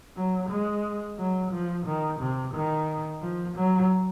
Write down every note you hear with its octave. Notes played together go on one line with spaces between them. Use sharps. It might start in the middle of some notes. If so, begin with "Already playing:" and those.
F#3
G#3
F#3
F3
D#3
C3
D#3
F3
F#3